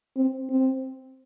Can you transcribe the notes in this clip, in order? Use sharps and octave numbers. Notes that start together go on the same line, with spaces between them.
C4
C4